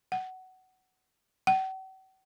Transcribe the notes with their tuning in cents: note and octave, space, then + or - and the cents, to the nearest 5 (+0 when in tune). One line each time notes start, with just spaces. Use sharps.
F#5 +15
F#5 +45